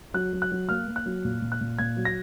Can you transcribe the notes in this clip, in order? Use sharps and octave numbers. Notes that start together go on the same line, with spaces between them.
F#3 F#6
F#3
F#6
F#3
A#3 F6
A#3
F#6
F#3
A#2
A#2
F#6
A#2
A#2 G#6
F#3
A#6